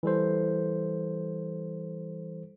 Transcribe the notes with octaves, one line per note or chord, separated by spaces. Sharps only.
E3 G3 A4 C5